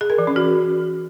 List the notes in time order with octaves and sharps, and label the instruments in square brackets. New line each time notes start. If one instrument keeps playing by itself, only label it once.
[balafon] G#4
A#4
E3
C#4
F#4